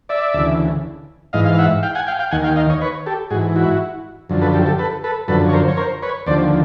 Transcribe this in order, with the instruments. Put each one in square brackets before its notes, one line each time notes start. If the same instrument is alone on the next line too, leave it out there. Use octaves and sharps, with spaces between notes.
[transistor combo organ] D5 E5
D2 C#3 E3
G#2 E3 D#5 F5
F5
E5 F#5
F5 G5
F#5 G#5
F5 G5
F5 G5
D#2 D#3 F#5 G#5
F5 G5
D#5 F5
C#5 D#5
B4 C#5
G4 A4
G#2 F#4 G#4
E3
E4 F#4
F#2 D3 F3
A4 B4
G4 A4
G4 A4
A4 B4
A4 B4
F#2 D3 F3 A4 B4
C#5
A#4 C5
C#5
A#4 C5
B4 C#5
D#2 D3 F3 C5 D5